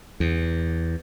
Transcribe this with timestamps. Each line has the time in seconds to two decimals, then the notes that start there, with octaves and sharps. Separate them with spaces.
0.20 E2